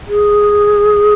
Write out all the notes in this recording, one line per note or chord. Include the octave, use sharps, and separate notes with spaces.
G#4